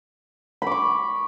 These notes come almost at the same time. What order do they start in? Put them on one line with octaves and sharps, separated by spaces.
B5 D6 C#6